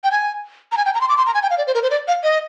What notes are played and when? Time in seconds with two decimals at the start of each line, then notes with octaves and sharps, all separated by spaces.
0.04 G5
0.12 G#5
0.72 A#5
0.77 G#5
0.86 G5
0.95 A#5
1.01 C6
1.09 D6
1.18 C6
1.26 A#5
1.34 G#5
1.43 G5
1.50 F5
1.58 D5
1.67 C5
1.75 A#4
1.83 C5
1.91 D5
2.08 F5
2.23 D#5